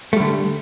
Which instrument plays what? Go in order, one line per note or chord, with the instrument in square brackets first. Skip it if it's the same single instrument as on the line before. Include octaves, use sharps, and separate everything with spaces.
[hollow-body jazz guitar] A3
G3
D3